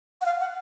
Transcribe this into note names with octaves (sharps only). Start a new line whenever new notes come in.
F#5
F5
F#5